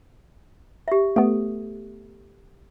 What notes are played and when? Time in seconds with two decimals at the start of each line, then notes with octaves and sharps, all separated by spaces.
0.88 G4 E5
1.16 A3 B3 A4